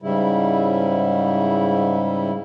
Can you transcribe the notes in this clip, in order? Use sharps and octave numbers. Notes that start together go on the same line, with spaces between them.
G#2 C#3 G3 E4